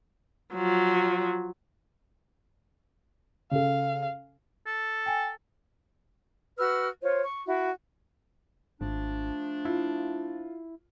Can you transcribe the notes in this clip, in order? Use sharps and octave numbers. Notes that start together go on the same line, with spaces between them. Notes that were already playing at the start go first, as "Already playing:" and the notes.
F3 F#3
C#3 A4 F5
A4
G5 G#5
F#4 B4 E6 F6
F4 C5 C#5
C#6
E4 F#4
G#1 F3 A3 D4
E4 F4